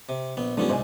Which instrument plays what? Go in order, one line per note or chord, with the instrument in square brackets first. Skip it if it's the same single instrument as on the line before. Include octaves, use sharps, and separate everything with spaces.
[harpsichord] C3
A#1 B3
[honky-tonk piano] G#2 F3 G3 [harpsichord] D3 B3 C#4
[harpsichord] C2 G#2 [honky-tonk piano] C5 D5 G#5